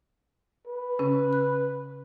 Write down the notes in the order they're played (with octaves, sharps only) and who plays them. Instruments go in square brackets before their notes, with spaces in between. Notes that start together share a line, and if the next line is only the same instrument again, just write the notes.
[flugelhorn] B4
[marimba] C#3 C#4
F#6